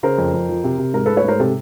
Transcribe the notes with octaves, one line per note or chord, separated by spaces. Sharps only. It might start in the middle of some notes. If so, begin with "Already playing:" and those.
C#3 A#4 C5
F2
F2
F3
C3
C3
G#2 A#4
A3 A4 B4
B4 C#5
G#2 A#4 C5
C3 A4